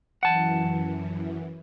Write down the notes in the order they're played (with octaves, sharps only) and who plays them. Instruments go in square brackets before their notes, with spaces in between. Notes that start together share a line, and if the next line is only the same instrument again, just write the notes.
[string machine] F#2 E3 [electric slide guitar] F#5 A5